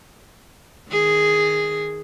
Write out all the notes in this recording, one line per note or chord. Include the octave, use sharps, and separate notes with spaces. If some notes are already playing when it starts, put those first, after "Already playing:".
D#3 G#4